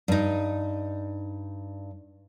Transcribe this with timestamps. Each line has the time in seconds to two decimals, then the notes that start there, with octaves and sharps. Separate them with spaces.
0.08 G2 D#4